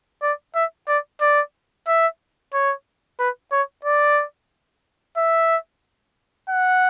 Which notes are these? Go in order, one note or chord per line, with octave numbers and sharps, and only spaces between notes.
D5
E5
D5
D5
E5
C#5
B4
C#5
D5
E5
F#5